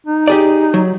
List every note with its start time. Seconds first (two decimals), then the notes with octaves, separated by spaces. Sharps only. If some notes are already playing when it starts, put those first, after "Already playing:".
0.07 D#4
0.28 G4 G#4 D5
0.74 F#3